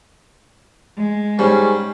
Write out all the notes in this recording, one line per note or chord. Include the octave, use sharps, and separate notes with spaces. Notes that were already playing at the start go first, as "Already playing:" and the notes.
G#3
G#2 G3 C#4